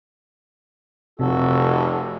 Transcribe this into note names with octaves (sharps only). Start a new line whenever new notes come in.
F1 C3 F#4 A4